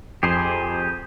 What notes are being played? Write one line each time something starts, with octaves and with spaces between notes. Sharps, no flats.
F2 G4 G#4 C5 C7